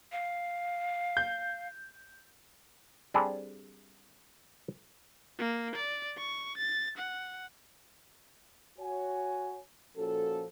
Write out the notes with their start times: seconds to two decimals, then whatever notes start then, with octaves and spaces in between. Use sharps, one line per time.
0.12 F5
1.17 G6
3.14 G3 C4 D4 G#4 A4
5.39 A#3
5.75 D5
6.18 C#6
6.57 A6
6.97 F#5
8.79 F#4 C#5 G#5
9.97 A#2 F3 C#4 F#4 A4